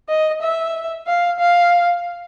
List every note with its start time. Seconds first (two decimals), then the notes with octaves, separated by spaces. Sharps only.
0.09 D#5
0.42 E5
1.07 F5
1.39 F5